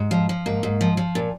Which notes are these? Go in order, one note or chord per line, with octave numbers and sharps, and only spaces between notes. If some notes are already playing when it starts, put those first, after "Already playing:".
Already playing: G#2
F3
F3
G#2 A#3
G#2
F3
F3
A#2